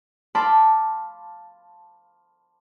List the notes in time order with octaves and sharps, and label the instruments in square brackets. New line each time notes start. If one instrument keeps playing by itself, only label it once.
[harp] F5 A5 B5 C6 D6